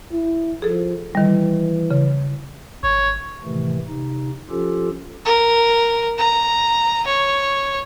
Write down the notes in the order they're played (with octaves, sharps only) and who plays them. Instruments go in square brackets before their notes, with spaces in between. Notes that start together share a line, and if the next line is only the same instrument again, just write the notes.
[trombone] E4
[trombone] F3 [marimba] G#4 A4
[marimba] D#3 G3 [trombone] E3
[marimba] C#3
[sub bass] G#1 [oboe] C#5
[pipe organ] A2 C3 D#3 E3 A3
C3 D#4
F3 C#4 F4 G4 A4
[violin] A#4
A#5
C#5